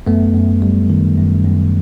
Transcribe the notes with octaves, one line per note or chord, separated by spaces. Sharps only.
F#2 A3 B3
F#2
G3
D#3
F#2
F#2